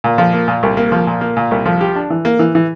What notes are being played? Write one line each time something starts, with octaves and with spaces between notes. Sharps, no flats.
A#2
F3
A#3
A#2
C2
A#3
F3
A#2
A#3
A#2
C2
F3
G4
D4
E3
A#3
E3
E3